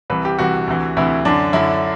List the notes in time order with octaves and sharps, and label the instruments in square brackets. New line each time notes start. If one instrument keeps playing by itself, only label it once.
[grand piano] C2 C3 E3 B4
G4
C2 C3 E3 F#4
D2 C3 E3
D2 C3 E3 E4
F#2 D3 D4
F#2 D3 E4